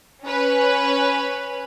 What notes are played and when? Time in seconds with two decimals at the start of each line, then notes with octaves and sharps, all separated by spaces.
0.23 C#4 B4